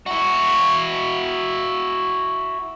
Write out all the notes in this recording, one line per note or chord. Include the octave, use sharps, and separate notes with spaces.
E4 F#4